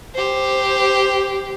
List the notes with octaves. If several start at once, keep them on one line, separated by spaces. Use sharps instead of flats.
G4 C5